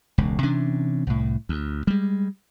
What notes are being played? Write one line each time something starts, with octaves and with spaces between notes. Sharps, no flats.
E1 C#2
C3 E3 C#4 D4
C2 A2
D2
G3 G#3